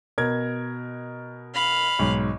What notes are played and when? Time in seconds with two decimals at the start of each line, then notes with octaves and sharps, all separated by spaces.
0.18 B2 A#4 G#6
1.54 F5 B5
1.99 B1 G#2